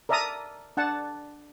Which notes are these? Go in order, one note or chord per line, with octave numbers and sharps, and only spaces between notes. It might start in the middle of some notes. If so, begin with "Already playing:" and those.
A#4 D5 E5 A5 A#5 D#6
D4 F#5 A5